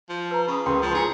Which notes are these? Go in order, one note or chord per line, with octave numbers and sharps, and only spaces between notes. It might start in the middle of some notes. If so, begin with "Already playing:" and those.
F3
B4 A#5
C#3 B5 C#6 D#6
C#2 A#4 B4 G5 C6
F3
D4 F4 G#4 C#5 A#5 C#7